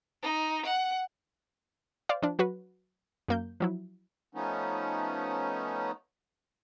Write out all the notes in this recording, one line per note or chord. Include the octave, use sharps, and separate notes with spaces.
D#4
F#5
C5 D5 F5
F3 D4
F#3 F#4 B4
F#2 A#3 G6
F3 F#3 E4
F3 A3 B3 C#4 D#4